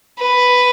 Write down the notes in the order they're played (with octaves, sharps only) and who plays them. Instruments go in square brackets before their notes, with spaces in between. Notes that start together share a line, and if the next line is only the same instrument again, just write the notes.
[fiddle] B4